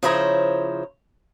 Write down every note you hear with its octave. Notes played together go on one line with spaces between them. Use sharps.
C#3 F3 E4 C5 C#5 A#5